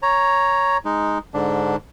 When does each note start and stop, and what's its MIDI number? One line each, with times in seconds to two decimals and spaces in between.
0.03 0.77 73
0.03 0.77 82
0.85 1.18 56
0.85 1.18 63
1.34 1.76 44
1.34 1.76 50
1.34 1.76 62